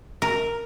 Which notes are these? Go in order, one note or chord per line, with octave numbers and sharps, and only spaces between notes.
A#4